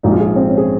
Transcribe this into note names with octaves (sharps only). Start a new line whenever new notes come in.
A#1 G#2 F3 D#4
F4
G#4
C4
C#4
G#4